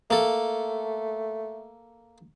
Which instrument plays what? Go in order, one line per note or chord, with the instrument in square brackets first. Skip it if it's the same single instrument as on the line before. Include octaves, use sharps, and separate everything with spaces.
[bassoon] A3 [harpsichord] A#3 A4